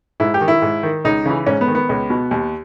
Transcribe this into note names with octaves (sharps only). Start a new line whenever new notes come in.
G#2 E4
G4
D#3
E4
G#2
D#3
C#2 D#4
C#3 E3
G#2 C#4
B3
D#3
B3
C#2
B2
D#2